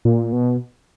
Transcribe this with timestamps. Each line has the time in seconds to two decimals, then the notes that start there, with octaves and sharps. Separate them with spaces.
0.05 A#2
0.32 B2